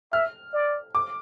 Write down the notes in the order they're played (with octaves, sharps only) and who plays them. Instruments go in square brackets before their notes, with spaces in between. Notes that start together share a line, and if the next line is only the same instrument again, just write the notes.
[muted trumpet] E5 [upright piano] F6
[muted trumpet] D5
[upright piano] D6